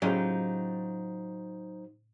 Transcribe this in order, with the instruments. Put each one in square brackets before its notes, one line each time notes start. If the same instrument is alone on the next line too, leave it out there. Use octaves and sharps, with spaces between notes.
[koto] A2 C#3 G#3 [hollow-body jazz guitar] F#3 F4 G4 [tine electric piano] D#4 C5